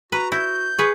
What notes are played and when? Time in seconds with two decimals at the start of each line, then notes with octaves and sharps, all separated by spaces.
0.12 F#4 B4 A#5
0.32 E4 G6
0.79 G#4 B4 C#6